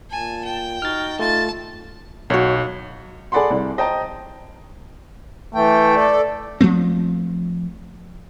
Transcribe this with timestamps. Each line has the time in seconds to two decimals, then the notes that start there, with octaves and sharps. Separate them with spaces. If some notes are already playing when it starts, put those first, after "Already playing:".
0.11 A#2 G#5 A5
0.45 G5
0.82 D#4 F#4 F6 A6
1.19 A3 F4 A5 A6
2.30 B1 F#4 C#5
3.32 G#4 A4 D5 F#5 B5 C6
3.50 C2
3.77 C5 D#5 G5 A5 A#5
5.55 E3 A3 G5
5.96 A4 D5
6.61 F3 F#3 A3 C4